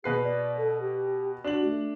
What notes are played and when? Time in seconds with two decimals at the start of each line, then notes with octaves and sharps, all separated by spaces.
0.04 B2 G#4 B4 C7
0.23 D5
0.57 A4
0.80 G4
1.44 D4 F#4 F#7
1.65 A3